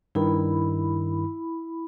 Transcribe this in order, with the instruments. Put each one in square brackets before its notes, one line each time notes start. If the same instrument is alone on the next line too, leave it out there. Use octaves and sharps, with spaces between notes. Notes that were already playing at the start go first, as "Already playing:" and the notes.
[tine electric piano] G2 D#3 [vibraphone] E4 B5